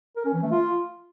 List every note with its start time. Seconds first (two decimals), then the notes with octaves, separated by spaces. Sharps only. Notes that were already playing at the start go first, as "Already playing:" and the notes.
0.16 A#4
0.25 C#4
0.34 E3
0.43 A3
0.51 F4